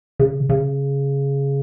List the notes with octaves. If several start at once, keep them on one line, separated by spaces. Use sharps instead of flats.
C#3
C#3